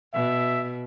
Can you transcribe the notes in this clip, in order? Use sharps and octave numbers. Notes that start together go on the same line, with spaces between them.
B2 E5